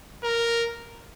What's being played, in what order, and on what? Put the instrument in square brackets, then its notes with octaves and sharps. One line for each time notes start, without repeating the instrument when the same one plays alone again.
[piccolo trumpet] A#4